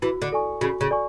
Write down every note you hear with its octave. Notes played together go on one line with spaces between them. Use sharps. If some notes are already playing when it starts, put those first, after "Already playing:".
E3 F#4
D3
A4 D5 G#5 C#6
C#3 F#4
C#3
A4 D5 G#5 C#6